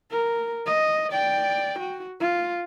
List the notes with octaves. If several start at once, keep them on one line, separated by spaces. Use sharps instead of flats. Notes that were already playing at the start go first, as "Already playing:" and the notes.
A#4
D#5
D5 G5
F#4
F4